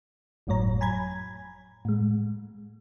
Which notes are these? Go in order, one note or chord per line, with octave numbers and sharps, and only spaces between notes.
G1 F2 A2 F#3 C#5 A#5
G#5 A#5 B5 G#6
A2 G#3